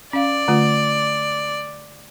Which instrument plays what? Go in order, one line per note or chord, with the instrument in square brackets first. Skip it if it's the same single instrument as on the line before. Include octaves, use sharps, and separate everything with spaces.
[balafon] C#4 F5 [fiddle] D5
[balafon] D3 A3 F4